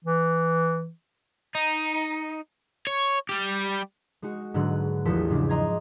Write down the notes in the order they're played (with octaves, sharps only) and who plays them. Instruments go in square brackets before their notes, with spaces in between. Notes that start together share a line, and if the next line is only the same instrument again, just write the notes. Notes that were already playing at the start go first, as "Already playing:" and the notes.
[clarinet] E3
[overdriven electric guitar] D#4
C#5
G3 G4
[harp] G#3 D#4 F#4
G#2 D3 F#3 B3 F#6
A1 E2 F3 A4 B6
G#2 C#3 D4
D#5 A#5 C6 G#6